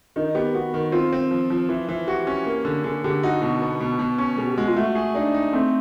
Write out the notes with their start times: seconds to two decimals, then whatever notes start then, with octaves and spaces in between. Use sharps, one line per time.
0.16 D#3 D#4
0.35 B3 G4
0.54 B3 F#4
0.74 D#3
0.92 C4 F4
1.13 C4
1.31 F3
1.50 F3
1.69 E3
1.89 E3
2.07 F#4 G4
2.27 C#4
2.46 A#3
2.65 D3
2.84 D3 G#4
3.04 D3 G4
3.23 D#4 F#4
3.42 B2 F#4
3.62 B3
3.81 B2
3.99 B2
4.18 C#4
4.37 B2 G#4
4.47 G4
4.56 G#3 F#4
4.67 F4
4.76 A3 F#4
4.95 G#4
5.15 D4 D#4
5.34 D#4
5.53 A3 C4